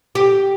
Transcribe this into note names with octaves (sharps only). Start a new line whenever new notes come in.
G4